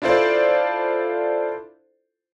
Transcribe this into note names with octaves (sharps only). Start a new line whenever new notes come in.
D4 E4 F4 A4 C5 D5